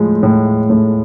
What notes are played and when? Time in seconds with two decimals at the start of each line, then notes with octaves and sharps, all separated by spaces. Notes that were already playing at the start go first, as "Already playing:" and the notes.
Already playing: A2 F3 G#3
0.23 A2
0.70 A2